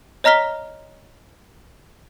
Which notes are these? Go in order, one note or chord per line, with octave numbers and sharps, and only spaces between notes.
C#5 D#5 A#5 F6 B6 G7